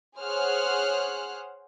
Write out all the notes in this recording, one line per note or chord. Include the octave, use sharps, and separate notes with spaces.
G#4 C5 C#5 F#5 F6 F#6